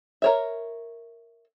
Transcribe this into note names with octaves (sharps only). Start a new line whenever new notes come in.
A#4 C#5 E5